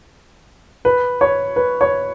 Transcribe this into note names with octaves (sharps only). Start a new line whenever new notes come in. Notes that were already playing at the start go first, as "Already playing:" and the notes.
B4
C#5
B4
C#5